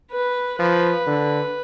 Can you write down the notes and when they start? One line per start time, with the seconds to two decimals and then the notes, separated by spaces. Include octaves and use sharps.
0.12 B4
0.59 F3 B4
1.07 D3